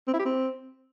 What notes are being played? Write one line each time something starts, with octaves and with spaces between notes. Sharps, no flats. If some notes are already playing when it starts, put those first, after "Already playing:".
C4
E4
G4
C4